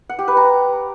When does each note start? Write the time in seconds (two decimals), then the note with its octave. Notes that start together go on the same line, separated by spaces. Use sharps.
0.09 F#5
0.19 G4
0.28 B4
0.37 A#5